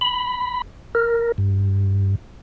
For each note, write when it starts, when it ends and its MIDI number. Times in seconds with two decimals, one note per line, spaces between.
0.01 0.62 83
0.95 1.32 70
1.38 2.15 43